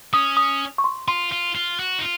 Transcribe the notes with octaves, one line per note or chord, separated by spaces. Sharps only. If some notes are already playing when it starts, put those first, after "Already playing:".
C#4 D#6
D#6
C#6
C6
F4 C6
F4
F4
F#4
D#4
F4